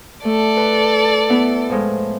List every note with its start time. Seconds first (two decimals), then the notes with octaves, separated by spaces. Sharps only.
0.25 A3 A4 D5
0.57 B4 A5
1.30 B3 E4
1.70 A2 F3 G#3